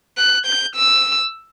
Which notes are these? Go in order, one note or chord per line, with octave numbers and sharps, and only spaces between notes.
F#6
G6
E6